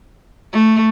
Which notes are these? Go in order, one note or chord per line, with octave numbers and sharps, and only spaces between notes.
A3